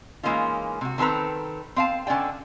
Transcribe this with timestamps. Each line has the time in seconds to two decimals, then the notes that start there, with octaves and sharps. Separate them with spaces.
0.23 E3 G#3 A#3 C#4 D#4 F4
0.81 C3 F#4
0.98 D#3 C4 A4 B4 A#5
1.76 C4 F5 A5
2.07 D3 C#4 D4 D5 G5